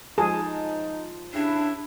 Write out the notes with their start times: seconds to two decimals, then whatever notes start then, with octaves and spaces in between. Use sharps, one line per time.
0.18 F3 G#3 D#4 G#4 A5
1.34 C#3 D4 E4 G4